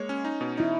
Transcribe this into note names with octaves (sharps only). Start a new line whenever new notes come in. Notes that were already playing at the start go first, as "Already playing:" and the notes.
Already playing: G#3 A#3 C#5
C#4
D#4
B2
D#4 E4